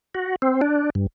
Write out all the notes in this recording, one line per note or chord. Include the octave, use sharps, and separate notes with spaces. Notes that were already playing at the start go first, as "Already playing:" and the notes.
F#4
C4
D4
G2